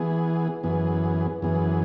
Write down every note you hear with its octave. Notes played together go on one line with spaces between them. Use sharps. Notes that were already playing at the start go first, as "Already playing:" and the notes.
Already playing: E3 B3 G#4
F#2 E3 B3 G#4
F#2 E3 B3 G#4